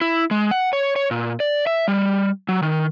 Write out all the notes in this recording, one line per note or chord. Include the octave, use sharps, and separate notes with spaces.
E4
G#3
F#5
C#5
C#5
A#2
D5
E5
G3
F#3
D#3